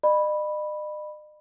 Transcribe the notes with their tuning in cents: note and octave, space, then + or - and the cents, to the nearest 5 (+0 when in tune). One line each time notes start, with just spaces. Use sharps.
D#5 -45 B5 -5